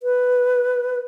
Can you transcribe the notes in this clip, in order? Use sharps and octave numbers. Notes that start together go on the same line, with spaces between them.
B4